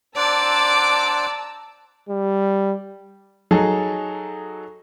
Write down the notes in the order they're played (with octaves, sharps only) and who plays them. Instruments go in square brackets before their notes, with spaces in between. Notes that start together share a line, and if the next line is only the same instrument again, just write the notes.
[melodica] D4 C5 F#5 [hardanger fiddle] D5 [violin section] A5 A#5 E6 [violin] D6
[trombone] G3
[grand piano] F#3 D#4 G#4 A4